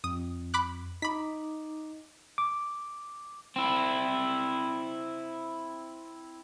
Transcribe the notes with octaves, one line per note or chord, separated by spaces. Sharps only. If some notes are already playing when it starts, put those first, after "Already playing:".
F2 D#6
B5 D6 F#6
D#4 B5 D6 B6
D6
C4 E4